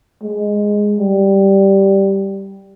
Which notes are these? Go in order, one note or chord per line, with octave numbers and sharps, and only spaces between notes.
G#3
G3